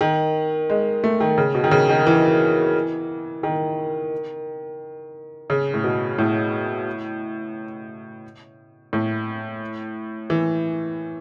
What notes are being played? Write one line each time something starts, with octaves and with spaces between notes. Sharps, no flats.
D#3
G#3
A3
D#3
C#3
B2
D#3
C#3
D#3
E3
D#3
C#3
A2
B2
A2
A2
E3